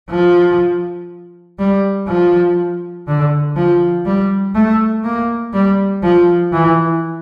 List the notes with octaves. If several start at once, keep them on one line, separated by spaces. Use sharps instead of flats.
F3
G3
F3
D3
F3
G3
A3
A#3
G3
F3
E3